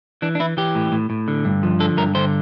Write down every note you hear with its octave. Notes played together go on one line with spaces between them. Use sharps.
E3 D4
D4
E3 E4
E3 G4
A2
A2
A2
D3
G2
F3
D3 A4
G2 A#4
D3 C5